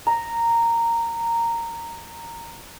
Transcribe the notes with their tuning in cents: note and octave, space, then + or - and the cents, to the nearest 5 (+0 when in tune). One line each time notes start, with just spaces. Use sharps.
A#5 -10